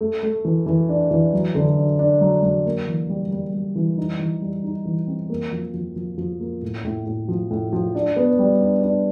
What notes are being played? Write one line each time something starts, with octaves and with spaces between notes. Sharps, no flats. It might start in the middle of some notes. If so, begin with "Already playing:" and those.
A3
A3
E3
E3
D4
E3
F#3
D3
D4
D4
F#3
F#3
A#3
E3
G3
G3
G3
E3
D#4
E3
G3
D#4
E3
C4
A#3
F3
F3
F3
F3
A#3
A2
A2
A2
F3
A2
F3
D4
B3
G3
D4
D4